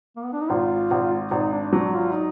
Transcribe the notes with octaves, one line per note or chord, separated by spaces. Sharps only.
A#3
B3
D4
D#4
G#1 F4
G#1
G#1 D#4
D4
F#3 D4
F4
D#4